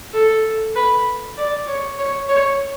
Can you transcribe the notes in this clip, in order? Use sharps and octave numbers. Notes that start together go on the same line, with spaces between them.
A4
B4
D5
C#5
C#5
C#5